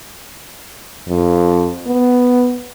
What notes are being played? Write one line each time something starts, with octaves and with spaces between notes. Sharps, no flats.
F2
B3